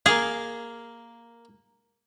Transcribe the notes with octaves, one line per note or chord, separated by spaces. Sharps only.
A#3 G#4 F5